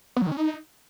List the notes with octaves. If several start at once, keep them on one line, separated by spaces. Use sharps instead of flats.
B3
F#3
D#3
C#4
D#4